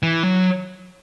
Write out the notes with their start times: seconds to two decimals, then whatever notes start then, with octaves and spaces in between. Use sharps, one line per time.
0.03 E3
0.23 F#3